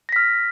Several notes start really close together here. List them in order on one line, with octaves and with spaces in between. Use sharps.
A#6 B6 F6